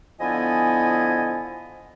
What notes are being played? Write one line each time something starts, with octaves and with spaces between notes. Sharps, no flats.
D3 F3 B3 E4 D#5 G#5